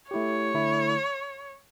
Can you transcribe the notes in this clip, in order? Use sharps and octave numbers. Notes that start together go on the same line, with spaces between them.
A3 E4 G4 C#5
D3 A3 E4 A4